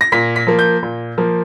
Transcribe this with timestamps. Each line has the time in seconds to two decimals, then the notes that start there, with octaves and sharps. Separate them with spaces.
0.01 A#6
0.12 A#2 B6
0.36 B6
0.47 F3 A#3
0.59 G6
0.83 A#2
1.18 F3 A#3